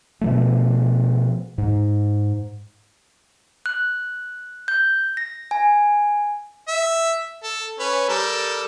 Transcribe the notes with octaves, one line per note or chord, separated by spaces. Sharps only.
B2 F3 A3
G#2
F#6
G6
A#6
G#5
E5
A4
C#4 B4
G3 A4 A#4